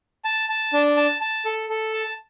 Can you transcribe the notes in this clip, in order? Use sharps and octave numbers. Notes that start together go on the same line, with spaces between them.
A5
A5
D4
A5
A5
A4
A4
A5